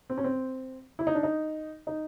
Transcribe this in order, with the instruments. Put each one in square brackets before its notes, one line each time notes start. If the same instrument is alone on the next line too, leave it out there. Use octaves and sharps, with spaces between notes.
[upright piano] C4
C#4
C4
E4
D#4
D4
D#4
D#4